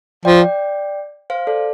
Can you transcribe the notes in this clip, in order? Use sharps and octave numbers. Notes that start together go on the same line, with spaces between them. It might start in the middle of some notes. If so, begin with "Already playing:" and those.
F3 D5 G5
C5 F5
A4 D5